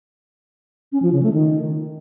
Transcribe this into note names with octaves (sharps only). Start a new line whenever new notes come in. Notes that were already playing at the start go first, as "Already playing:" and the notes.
C#4
F3
C#3
A3
D#3